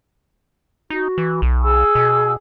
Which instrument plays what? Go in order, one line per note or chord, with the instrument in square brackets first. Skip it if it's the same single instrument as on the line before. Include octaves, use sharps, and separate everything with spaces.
[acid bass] D#4 [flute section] F#4
[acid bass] E3
B1
[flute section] G#4 G#5 E6
[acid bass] B2